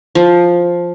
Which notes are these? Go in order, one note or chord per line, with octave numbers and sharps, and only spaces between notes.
F3